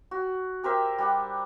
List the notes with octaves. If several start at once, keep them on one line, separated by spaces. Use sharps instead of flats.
F#4
G4 A#4 C5 E5
G3 D4 F#5